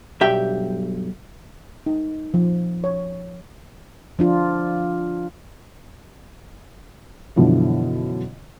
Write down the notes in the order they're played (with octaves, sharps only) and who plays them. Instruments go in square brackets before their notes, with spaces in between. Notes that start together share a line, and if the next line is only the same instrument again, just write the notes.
[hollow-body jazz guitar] B1 G2 G4 E5 G5
[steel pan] D#4
F3
C#5
[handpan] F3 D4 F4
[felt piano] F#2 B2 D3 E3 F3